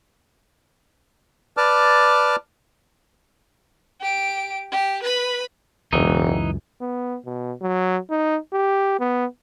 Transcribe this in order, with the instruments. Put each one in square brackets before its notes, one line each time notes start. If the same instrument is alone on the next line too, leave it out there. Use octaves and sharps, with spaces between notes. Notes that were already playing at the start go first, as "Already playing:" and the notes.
[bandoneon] B4 D5 A5 D6 F6
[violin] G4 D7
G4
B4 B5
[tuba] E1 [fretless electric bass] C#2 F#2 [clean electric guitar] E3 D#4
[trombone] B3
B2
F#3
D#4
G4
B3